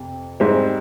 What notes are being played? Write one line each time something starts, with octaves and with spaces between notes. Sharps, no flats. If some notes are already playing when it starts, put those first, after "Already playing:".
Already playing: F2 C3
G#2 G3 C4